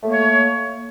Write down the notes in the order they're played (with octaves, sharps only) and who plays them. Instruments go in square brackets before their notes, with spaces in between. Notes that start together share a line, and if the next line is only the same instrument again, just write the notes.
[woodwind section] A3
A#3
C#5